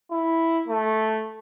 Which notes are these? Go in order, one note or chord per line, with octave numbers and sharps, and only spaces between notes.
E4
A3